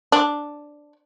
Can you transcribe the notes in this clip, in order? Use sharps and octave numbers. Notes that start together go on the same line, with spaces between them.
D4